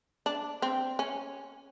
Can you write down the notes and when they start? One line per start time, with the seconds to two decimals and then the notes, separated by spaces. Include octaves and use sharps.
0.26 D4
0.62 C4
0.99 C#4